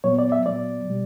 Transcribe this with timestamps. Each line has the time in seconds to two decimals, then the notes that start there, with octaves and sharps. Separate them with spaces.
0.04 A#2 F#3 B3 C#5
0.19 D5
0.32 E5
0.46 A#2 F#3 B3 D5
0.87 B2 G3